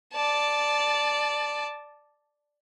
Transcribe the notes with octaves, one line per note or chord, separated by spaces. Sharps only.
D5 A5